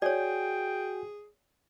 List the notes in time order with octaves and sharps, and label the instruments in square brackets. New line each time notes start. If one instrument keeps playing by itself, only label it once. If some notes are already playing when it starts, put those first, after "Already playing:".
[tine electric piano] F#4 G#5 [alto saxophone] G#4 [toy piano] C#5 D5 [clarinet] G5